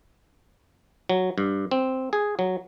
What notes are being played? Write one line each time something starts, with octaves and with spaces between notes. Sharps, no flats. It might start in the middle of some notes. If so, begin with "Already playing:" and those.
F#3
G2
C4
G#4
F#3